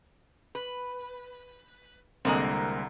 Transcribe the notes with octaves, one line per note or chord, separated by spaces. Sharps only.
B4
C2 D3 G#3 A#3 C4 A#5